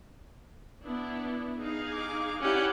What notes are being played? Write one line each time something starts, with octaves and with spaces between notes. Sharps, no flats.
B3 D4 E4
D#4 G#4 F5
D6
C#4 E4 G4 D5 F#5